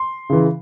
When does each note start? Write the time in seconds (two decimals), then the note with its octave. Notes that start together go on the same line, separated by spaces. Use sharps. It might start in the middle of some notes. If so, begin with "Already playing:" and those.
Already playing: C6
0.30 C#3 E3